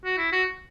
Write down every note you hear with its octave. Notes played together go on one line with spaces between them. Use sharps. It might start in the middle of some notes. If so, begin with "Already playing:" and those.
F#4
E4
F#4